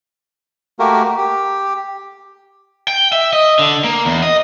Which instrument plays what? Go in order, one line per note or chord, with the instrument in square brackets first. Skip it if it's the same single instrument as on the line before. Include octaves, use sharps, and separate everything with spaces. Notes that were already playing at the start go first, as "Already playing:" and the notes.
[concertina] A3 A#3 F#4 G4 A#4
G4
[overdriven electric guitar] G5
E5
D#5
D3
A#3
E2
D#5